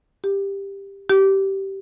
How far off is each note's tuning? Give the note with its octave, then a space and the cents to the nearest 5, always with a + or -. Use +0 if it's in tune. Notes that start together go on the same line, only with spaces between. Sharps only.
G4 +10
G4 -15